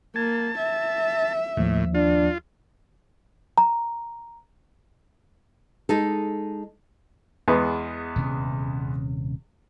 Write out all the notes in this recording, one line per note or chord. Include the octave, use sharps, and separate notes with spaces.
A#3 A5 G#6
E5
D#2 A2 F3
D4 F4
A#5
G#3 D#4 A4
E2 G#3 B3
D#1 C3 C#4